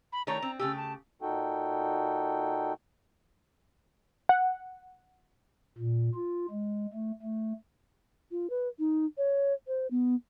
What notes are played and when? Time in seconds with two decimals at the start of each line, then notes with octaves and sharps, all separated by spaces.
0.12 B5
0.27 D#3 A3 C#5 A#5
0.42 C4
0.59 C#3 A3 G4 E6
0.77 A5
1.22 A#2 D#4 F#4 A4 G5
4.29 F#5
5.78 A#2
6.14 F4
6.50 G#3
6.93 A3
7.22 A3
8.31 F4
8.50 B4
8.79 D#4
9.18 C#5
9.67 C5
9.91 B3